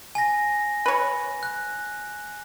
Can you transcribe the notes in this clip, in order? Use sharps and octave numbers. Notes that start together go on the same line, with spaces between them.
G#5 A#6
B4 C#5
F#6